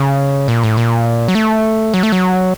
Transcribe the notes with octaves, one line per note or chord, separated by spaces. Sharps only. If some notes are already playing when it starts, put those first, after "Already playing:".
Already playing: C#3
A#2
A2
A#2
F#3
A3
F#3
A3
F#3